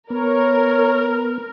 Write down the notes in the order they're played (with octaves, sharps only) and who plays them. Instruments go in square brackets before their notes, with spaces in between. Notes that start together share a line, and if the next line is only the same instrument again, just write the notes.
[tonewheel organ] B3 [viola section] A#4 [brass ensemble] C#5